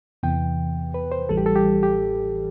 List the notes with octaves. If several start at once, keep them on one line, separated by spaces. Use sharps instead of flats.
E2 C3 E3 B3 G5
B4
C5
A1 A2 E3 G3 A4
G4
A4
G4
G4